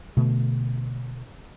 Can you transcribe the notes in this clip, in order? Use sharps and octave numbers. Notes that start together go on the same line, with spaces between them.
B2 D3 A3